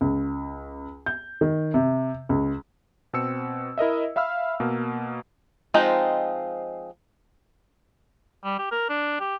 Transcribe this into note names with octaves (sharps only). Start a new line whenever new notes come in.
C#2
G6
D#3
C3
C#2
B2 C4 E6 C#7
E4 A#4 D#5 E5
E5 F5 B5 E6 F6
B2 A#3
F3 G#3 C4 D#4 F4
G3
G4
A#4
D4
G4